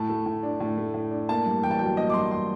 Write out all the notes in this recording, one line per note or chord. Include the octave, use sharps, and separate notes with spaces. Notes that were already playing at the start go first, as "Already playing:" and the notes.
Already playing: A2 A5
A3
A2
D4
A2
A3
A2
D4
A#3 A5
G2
A1 G5
A5
F#3 G5
A#3 D#5
D6
G2 C6
C6